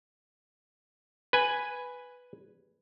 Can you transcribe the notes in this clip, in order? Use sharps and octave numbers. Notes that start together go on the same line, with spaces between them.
B4 G#5